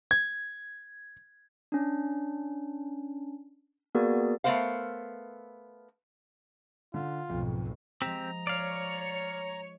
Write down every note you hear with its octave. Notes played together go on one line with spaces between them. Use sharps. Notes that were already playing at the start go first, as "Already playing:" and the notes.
G#6
C#4 D4
A#3 B3 F#4 G#4 A#4 D5
A3 B3 C4 A#4 C5 F5
D3 F4
B1 F2 G#2
F3 G#3 C4 G4 G#4 A#5
C#5 D5 F5